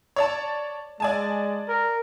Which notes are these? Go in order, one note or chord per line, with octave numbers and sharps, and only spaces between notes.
C#5 D5 A5
G#3 D5 G#5 A5
A#4